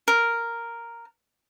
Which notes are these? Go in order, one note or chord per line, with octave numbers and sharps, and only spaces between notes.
A#4